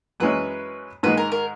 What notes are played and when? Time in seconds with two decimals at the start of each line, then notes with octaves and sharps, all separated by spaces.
0.20 F#2 E3 G#3 C#4 B4
1.03 G#2 D#3 G#3 B4
1.17 A#4
1.32 A#4